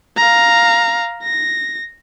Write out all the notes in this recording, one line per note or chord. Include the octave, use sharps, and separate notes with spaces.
F5 A#5
A#6